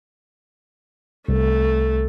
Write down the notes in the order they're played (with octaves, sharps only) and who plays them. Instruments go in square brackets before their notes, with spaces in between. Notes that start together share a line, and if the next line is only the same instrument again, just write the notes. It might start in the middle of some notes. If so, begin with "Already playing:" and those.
[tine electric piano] C2 [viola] A3